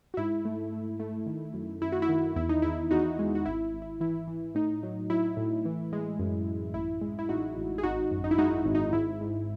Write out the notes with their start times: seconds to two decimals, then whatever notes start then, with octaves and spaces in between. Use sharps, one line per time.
0.14 F#4
0.17 G#2 E4
0.45 A3
0.72 A3
1.00 A3
1.26 D#3
1.54 F#2
1.81 F#2 E4
1.92 F#4
2.02 E4
2.09 D#3
2.36 E2 E4
2.49 D#4
2.62 E2 E4
2.91 E2 D#4 F#4
3.19 G#3
3.35 F#4
3.46 G#1 E4
3.73 G#1
3.82 E4
4.00 E3 E4
4.28 E3
4.55 A2 D#4
4.83 F#3
5.10 F#3 E4
5.37 A2
5.65 E3
5.93 G#3
6.19 F#2
6.47 F#2
6.74 A1 E4
7.01 G#3
7.19 E4
7.29 A1 D#4 F#4
7.57 A1
7.78 G#4
7.83 G#1 D#4 F#4
8.11 F#2
8.24 D#4
8.31 E4
8.38 G#3 D#4 F#4
8.65 G#1
8.75 D#4
8.93 G#2 E4
9.21 G#2